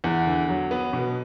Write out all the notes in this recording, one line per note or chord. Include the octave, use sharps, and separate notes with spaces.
E2 F#5
D3
F#3
B3
B2